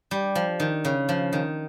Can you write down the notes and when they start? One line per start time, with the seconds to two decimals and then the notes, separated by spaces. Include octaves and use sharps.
0.11 G3
0.35 F3
0.60 D#3
0.85 C#3
1.09 F3
1.33 D#3